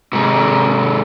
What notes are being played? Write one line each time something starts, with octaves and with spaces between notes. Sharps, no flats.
G#2 C3